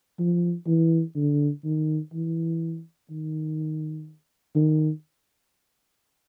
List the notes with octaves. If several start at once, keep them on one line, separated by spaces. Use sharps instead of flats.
F3
E3
D3
D#3
E3
D#3
D#3